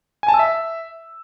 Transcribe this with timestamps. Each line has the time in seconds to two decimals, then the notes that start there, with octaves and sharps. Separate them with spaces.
0.23 G#5
0.28 A5
0.34 E6
0.39 E5